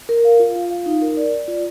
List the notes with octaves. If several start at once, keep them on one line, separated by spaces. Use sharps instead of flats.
A#4
F5
F4
F4
F5
D#4
A#4
D5
D5
F4